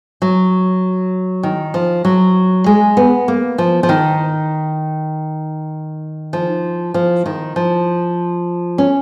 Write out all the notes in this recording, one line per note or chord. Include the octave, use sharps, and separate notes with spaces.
F#3
D#3
F3
F#3
G#3
B3
A#3
F3
F3
D#3
F3
F3
D#3
F3
C#4